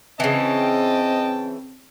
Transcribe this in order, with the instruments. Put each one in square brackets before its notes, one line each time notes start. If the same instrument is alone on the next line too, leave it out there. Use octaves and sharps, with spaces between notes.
[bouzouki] C#3 E3 [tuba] C4 [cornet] D#5 [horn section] G5 A5